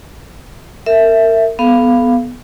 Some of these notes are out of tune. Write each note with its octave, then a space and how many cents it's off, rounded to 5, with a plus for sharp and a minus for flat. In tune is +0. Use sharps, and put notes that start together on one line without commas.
A#4 -30 E5 +0
B3 +0 A4 -35 F5 -10